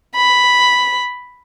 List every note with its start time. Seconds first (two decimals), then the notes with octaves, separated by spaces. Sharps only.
0.15 B5